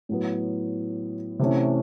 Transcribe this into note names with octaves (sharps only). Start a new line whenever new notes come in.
A2 F#3 B3
C3 E3 A3 C#4